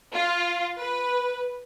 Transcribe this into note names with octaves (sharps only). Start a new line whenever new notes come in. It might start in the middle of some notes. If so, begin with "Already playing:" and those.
F4
B4